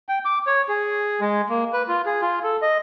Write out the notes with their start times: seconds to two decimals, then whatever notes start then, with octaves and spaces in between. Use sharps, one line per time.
0.09 G5
0.25 D6
0.47 C#5
0.69 G#4
1.20 G#3
1.49 A#3
1.73 B4
1.88 F4
2.06 G#4
2.22 F4
2.43 A4
2.62 D#5